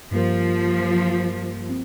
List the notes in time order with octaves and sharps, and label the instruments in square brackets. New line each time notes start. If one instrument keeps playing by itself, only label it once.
[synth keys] G2 G3 A#3 G4 A#4 [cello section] F3
[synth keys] C4